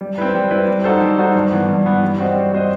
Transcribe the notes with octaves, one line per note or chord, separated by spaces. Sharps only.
G3
C4 E4 B4
G3
C4 E4 B4
G3
D#4 F#4 A4 C5
G3
D#4 F#4 A4 C5
G2
E3 B3
G2
E3 B3
G3
C4 F#4 C5 D#5
G3
C4 F#4 C5 D#5